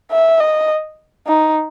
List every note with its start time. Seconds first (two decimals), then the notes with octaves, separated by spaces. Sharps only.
0.11 E5
0.40 D#5
1.27 D#4